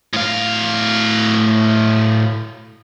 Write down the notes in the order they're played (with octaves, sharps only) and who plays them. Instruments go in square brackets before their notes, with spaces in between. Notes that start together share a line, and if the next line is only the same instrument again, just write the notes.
[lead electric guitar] A2 F5